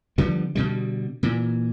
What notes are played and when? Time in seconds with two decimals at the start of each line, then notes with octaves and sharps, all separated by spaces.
0.18 D3 F3 G3 B3
0.55 B2 D3 G3
1.23 A#2 E3